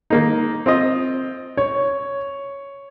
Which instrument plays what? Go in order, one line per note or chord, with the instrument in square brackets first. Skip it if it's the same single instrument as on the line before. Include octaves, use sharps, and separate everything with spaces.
[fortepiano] D#3 A#3 D#4
C4 F4 D#5
[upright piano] C#5